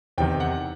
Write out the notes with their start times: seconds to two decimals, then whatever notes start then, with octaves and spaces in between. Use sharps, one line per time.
0.18 E2 C3 D#3 G5
0.40 F#5